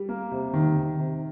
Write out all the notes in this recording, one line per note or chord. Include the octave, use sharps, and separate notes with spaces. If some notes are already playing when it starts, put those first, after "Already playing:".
Already playing: G3
A#3
C3
D#3
D#3
C3